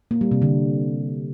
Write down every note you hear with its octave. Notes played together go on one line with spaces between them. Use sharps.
A#3
G3
C3
D3